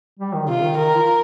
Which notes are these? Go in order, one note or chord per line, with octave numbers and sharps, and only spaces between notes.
G3
D#3
C3 F4
D#3
D#3 A#4
F4